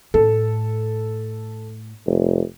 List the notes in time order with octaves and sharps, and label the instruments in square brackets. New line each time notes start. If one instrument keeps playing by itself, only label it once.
[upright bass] A2 [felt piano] A4
[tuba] F1